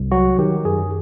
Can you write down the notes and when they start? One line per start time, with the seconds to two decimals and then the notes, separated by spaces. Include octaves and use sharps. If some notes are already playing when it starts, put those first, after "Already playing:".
Already playing: C2
0.11 F#3 F#4
0.39 D#3 G4
0.65 F#2 G#4